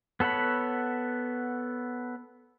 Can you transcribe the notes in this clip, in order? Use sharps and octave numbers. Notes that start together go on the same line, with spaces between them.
B3 A4 C#5 F#5 B5